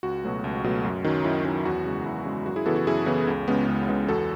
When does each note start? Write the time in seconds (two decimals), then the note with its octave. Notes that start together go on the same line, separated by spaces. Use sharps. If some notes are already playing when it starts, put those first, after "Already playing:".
0.03 C#2 F#4
0.24 B2 F#3 A3
0.44 C#2
0.64 B2 F#3 A3
0.85 F#2
1.04 D#3 F#3 C#4
1.24 F#2 E4
1.44 D#3 F#3 C#4
1.65 E2 F#4
1.85 C#3 G#3
2.05 E2 E4
2.25 C#3 G#3
2.46 F#2 F#4
2.56 E4 G#4
2.66 C#3 E3 B3 F#4 A4
2.76 F#4
2.87 F#2 E4 G#4
3.06 C#3 E3 B3
3.27 C#2
3.48 C#3 G#3 B3
3.68 C#2
3.88 C#3 G#3 B3
4.08 E2 F#4 A4